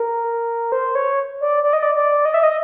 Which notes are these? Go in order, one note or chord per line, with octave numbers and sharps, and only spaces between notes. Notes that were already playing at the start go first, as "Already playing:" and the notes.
Already playing: A#4
C5
C#5
D5
D5
D#5
D5
D5
D#5
E5
D#5